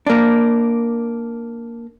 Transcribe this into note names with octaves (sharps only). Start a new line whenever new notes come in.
A#3 D4